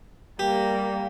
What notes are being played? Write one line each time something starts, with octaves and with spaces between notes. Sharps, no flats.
G3 A#3 G4